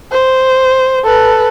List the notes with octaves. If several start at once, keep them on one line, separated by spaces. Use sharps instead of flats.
C5
A4 B4